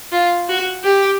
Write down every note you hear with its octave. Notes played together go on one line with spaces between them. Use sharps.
F4
F#4
G4